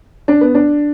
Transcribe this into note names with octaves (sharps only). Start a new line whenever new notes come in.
D4
B3
D4